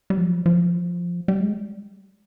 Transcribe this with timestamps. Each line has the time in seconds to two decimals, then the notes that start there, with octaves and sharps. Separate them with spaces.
0.10 G3
0.17 F3
0.46 F3
1.28 G3
1.41 G#3